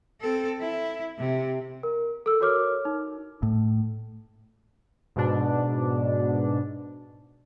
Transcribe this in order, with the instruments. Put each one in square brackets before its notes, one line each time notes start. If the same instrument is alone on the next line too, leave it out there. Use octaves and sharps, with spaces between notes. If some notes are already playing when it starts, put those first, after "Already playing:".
[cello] C4 A4
E4
C3
[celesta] A#4
A4 E6
F#4 A#4 C#5 D6 F6
D#4
[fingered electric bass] A2
[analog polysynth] G#2 B2 D4